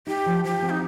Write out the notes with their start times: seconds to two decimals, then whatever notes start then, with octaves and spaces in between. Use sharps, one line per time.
0.07 D#4 G4
0.26 F3
0.44 F3 G4
0.62 C4
0.70 D#4